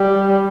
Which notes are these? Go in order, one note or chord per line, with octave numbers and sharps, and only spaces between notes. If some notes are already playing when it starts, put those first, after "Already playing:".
Already playing: G3